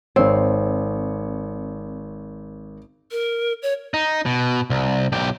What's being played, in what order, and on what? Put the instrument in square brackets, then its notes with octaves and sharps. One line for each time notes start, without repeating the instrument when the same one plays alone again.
[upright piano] G#1 C#5 [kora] C4
[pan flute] A#4
C#5
[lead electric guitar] D#4
B2
C2
B1 G4